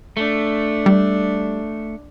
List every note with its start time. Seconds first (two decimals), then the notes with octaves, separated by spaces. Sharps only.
0.17 A3 D4
0.86 G3